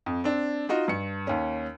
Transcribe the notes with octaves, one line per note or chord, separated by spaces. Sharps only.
F2
C4 D4
D#4 F4 F#4 D#5
G2 C#7
D#2 C#4